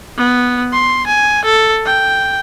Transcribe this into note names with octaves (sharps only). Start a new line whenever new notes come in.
B3
C6
G#5
A4
G5